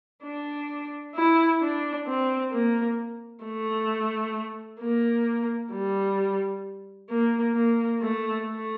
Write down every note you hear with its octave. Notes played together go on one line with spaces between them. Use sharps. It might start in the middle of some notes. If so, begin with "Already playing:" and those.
D4
E4
D4
C4
A#3
A3
A#3
G3
A#3
A#3
A3
A3